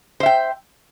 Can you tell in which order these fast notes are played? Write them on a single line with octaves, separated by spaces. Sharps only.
C5 E5 G5